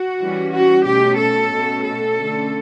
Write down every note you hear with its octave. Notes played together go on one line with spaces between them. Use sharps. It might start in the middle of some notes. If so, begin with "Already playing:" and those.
Already playing: F#4
E3 G3 C#4
F#4
B2 A3 C#4 G4
A4
B2 A3 C#4
A4
D3 A3 C#4